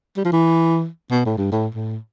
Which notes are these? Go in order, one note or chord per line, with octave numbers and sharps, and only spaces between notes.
G3
F3
E3
B2
A2
G2
A2
A2